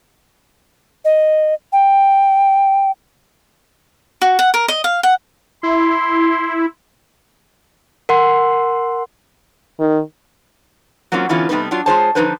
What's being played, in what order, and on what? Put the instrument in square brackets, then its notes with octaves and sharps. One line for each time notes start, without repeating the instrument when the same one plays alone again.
[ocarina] D#5
G5
[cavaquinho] F#4
F#5
A#4
D#5
F5
F#5
[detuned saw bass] E4 [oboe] C6
[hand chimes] A#4 F#5 C6
[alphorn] D#3
[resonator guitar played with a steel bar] F#3 A#3 C4 C#4 F4
D3 E3 B3 C#4 E4 F4
C3 G3 A3 B3 D#4 B4
F#3 D4 F4
G#3 F4 G#4 C5 C#5 A5
D3 F3 D#4 F4 B4 C5